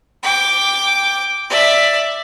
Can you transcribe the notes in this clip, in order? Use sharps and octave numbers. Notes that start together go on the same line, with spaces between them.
G5 D6
D5 E5